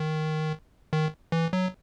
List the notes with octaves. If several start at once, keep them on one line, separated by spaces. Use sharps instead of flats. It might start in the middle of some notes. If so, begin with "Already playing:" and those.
Already playing: D#3
D#3
E3
F#3